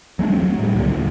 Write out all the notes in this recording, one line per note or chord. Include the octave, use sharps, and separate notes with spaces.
F#3 G#3 A3 D4
E2 F#3 C4
F#3
A2 G3
C#2 F#2 A#2 D3
D2 A2